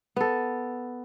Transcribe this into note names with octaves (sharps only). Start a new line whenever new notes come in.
B3 A4